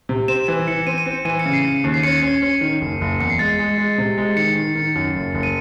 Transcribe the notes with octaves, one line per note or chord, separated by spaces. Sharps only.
C3
C4 E7
E3 E7
E3 C#7
C4 D#7
D#7
C4 C#7
E3 D#7
C#7
C#3
C7
C#3 C#7
D#2
C7
C#4 C#7
C#4
C#4
D#3
F#1
F#1
E2 C#7
C7
G#3 A6
C7
G#3
G#3
C3
G#3
D#3 C#7
D#3
D#3
F#2
F#1
F#1
D#7